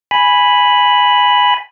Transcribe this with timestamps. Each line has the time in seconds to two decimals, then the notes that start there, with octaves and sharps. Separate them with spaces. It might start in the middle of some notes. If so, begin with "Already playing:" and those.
0.11 G#5 B5